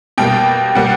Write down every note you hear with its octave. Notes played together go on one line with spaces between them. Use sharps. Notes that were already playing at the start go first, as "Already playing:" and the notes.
B2 G3 A#3 G5
B2 G3 A#3 F#5